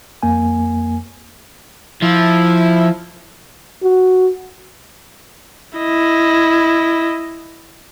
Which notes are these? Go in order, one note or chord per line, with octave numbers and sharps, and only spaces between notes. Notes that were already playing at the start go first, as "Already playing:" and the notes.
F2 A#3 G#5
F3 E4
F#4
E4 D#5